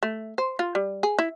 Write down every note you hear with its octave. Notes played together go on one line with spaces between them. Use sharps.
A3
C5
F4
G3
G#4
E4